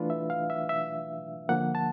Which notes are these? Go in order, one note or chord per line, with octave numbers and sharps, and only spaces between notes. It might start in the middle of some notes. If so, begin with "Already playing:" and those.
Already playing: E3 A3 D4 F4 B4
E5
F5
E5
E5
D3 F3 A#3 F#5
A5